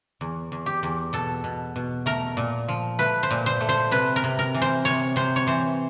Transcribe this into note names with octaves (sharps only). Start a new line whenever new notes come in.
E2
E2
G4
E2
B2 A4
B2
B2
A3 A#4
A#2
F3
A3 B4
C5
A#2
C5
A3
C5
C3 B4
A#4
C3
A#4
E3
C5
C3 C#5
C3 C5
C#5
E3 C5